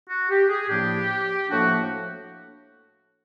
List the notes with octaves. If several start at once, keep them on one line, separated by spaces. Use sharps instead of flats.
F#4
G4
G#4
A2 F3 A#3 D4 G4
A2 F3 A#3 D4 F#4